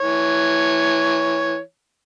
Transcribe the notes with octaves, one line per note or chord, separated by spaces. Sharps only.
E3 C#5